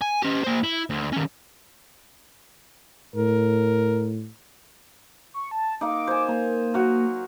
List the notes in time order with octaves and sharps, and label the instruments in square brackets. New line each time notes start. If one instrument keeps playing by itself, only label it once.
[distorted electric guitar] G#5
C#4 G4
A#3 C5
E4
D2
D#3 C#4
[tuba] A2 [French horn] A#4
[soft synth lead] C#6
A5
[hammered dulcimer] A#3 D#4 [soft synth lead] D6
[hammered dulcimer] C5 G#5
[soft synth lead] A#3 [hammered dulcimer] A#5
[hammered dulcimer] F#3 F#4 A#4